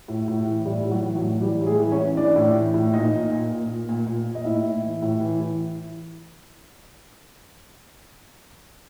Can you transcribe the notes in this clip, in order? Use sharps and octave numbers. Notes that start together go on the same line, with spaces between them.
A2
A2
E3
A2 G3 G4
A2
F#3 F#4
E3
F#3 F#4
A2
E3 G3 G4
A2
G#3 G#4
E3
C#4 C#5
E3
E3 D4 D5
A2
E3
A2
A#2 D#4 D#5
A#2
A#2
A#2
A#2
A#2
A#2
A#2
D#5
A2 E4 E5
A2
E3
A2
E3
E3